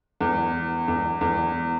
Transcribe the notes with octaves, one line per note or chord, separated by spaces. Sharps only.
E2
E2
E2